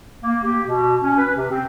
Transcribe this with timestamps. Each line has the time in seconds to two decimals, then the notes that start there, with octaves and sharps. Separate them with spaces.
0.23 A#3
0.44 G4
0.66 B2
1.01 C#4
1.17 B4
1.36 C3
1.51 C4